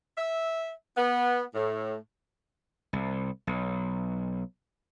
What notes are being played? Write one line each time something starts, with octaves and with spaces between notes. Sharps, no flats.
E5
B3
A2
C2
B1